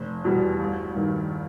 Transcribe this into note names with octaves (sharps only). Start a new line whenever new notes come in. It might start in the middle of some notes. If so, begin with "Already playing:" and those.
Already playing: F1
E2 B2 G3
G1
G2 D#3